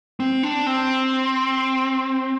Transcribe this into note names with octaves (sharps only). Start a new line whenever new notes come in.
C4
D4
C4